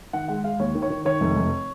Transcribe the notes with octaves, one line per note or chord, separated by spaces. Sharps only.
D#3 F#5
G#3 F#5
G#3 F5
D#2 C#5
D#3
C#5
D#3
D#3 C#5
F1
F1